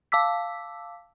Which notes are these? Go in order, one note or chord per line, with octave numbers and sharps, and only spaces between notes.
F5 A5 D6 E6 B6